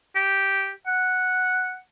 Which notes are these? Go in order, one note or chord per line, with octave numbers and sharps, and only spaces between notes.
G4
F#5